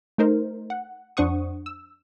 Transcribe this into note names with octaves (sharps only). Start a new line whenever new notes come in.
A3 D#4 A#4 C5
F#5
F2 D4 C5 F#5 C#6 D#6
E6